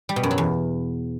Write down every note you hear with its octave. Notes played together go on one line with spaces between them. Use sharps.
G3
B2
F#2
F#3
E2